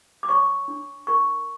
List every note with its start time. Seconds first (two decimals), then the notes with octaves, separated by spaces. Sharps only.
0.23 D6
0.29 C#5 C#6
0.68 D4
1.07 A#4 C#6